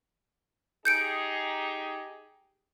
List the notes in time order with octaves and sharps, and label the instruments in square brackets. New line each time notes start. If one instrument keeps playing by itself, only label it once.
[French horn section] D#4 G4 G#4 [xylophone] G6 C#7 D7